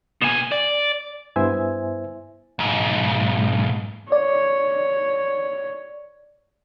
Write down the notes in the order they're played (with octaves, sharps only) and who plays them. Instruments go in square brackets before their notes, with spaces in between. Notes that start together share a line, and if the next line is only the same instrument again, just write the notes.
[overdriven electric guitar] B2 G#5
D5
[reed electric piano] G2 B3 E4 C5 E5 G#5
[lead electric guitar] B1 G#2
[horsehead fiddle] C#5 [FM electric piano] D5